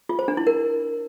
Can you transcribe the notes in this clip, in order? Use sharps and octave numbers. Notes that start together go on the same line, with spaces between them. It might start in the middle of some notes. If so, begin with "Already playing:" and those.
F4
C5
D4
E4
A#4